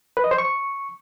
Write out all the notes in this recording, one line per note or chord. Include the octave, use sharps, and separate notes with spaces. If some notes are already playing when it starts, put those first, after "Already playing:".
B4
D#5
C5
C#6